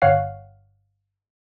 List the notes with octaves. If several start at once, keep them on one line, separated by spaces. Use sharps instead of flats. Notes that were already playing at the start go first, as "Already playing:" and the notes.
G1 C#5 F5 F#5 C7